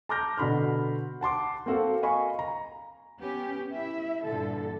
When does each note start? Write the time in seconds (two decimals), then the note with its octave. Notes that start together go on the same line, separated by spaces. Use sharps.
0.09 A5 A#5 D6 F6 G6 A#6
0.38 B2 D3 B5 C6 F6
1.21 F#5 A5 C6 D6
1.66 A#3 C4 F#4 A4 F5
2.03 D#5 F5 G#5 B5 C#6
2.39 A#5
3.19 B3 C#4 G4
3.72 E4 E5
4.24 G2 A#2 D3 E3 A4